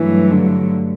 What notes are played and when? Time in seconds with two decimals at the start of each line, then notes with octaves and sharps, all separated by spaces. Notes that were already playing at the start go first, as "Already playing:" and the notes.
Already playing: G2 E3 F#3 A3
0.32 D3